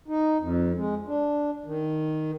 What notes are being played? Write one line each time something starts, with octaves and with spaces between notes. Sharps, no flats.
D#4
F2
G#3
D4
D#3